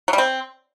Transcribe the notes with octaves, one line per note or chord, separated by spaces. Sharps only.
F#3
G3
C4